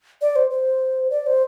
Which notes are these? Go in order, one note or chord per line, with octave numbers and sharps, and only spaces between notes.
D5
C5
C5
D5
C5